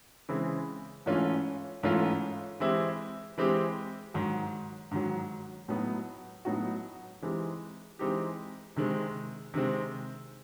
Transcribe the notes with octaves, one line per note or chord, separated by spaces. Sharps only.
C#3 E3 G#3 C4 E4
G#2 E3 A3 C#4 F4
G#2 E3 A3 C#4 F4
E3 G#3 C4 E4 G4
E3 G#3 C4 E4 G4
G#2 D#3 F#3
G#2 D#3 F#3
A2 F#3 B3 D#4 F#4
A2 F#3 B3 D#4 F#4
E3 G#3 C4 D#4 G4
E3 G#3 C4 D#4 G4
C3 D#3 G#3 C4
C3 D#3 G#3 C4